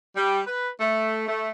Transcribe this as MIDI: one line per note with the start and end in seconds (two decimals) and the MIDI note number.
0.16 0.40 55
0.46 0.70 71
0.81 1.26 57
1.29 1.51 57